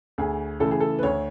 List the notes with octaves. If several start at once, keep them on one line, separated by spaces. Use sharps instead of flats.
D2 G#4
C#3 E3 A3 A4
G#4
A4
B4
D2 C#5